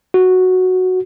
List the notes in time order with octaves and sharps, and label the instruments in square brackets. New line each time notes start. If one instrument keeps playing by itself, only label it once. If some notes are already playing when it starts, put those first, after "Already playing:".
[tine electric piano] F#4